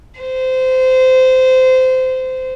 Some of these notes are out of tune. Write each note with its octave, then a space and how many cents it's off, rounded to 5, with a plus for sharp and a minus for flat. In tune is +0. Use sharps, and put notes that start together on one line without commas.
C5 -20